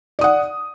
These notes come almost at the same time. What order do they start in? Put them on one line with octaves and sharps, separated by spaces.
D5 D#6 F#5